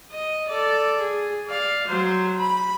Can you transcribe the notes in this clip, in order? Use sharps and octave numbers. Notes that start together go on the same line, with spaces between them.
D#5
A4 D5
G#4
D5 F5
F#3 C5
B5